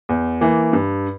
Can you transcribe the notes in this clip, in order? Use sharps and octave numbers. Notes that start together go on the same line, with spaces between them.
E2
E3 A#3
G2